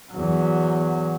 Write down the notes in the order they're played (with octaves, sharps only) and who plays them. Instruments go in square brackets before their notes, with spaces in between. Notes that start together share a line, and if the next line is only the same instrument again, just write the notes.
[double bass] E2 F#3